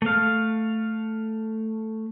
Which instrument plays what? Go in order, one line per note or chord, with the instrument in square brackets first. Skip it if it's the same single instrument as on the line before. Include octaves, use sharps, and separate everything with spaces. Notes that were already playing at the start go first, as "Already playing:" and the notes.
[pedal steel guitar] A3 F5